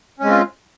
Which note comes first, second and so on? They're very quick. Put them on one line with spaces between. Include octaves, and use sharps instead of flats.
C#4 G#3 C4 F4